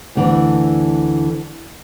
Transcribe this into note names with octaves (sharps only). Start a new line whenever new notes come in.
D2 D3 E3